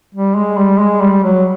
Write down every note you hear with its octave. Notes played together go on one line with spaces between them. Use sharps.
G3
G#3
G3
G#3
G3
F#3